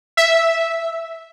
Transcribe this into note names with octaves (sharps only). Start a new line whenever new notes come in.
E5